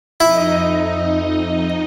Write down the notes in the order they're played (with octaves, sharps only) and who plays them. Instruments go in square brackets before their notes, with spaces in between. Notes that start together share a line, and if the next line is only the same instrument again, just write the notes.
[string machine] F2 D#4 D#5 [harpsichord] E4